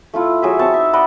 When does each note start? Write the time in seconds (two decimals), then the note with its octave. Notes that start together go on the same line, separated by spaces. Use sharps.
0.14 A3 E4 F4
0.42 F#3 G#4 E5
0.59 C4 A5 C#6
0.74 D#4 E5
0.93 D5 D#5 F#5 B5